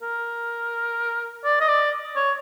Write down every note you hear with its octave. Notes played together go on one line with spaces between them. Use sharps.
A#4
D5
D#5
D5
C#5